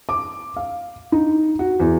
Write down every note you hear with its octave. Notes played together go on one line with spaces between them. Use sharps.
D6
F5
D#4
F#4
E2